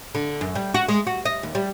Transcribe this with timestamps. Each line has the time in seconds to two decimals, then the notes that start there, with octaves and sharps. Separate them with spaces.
0.15 D3
0.41 F#2
0.55 G3
0.74 F#4
0.88 G#3
1.07 F#4
1.25 D#5
1.43 D#2
1.55 G3